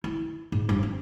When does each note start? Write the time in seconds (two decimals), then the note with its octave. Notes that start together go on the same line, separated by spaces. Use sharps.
0.04 E4
0.52 G#2
0.69 G2
0.83 C4